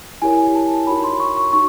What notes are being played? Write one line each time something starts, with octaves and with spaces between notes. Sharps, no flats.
E4 G4 A#4 C#5 G#5
A5
D#4 F#4 A#4 C#5 B5
C6
C#6
C#6
D#4 F#4 C#6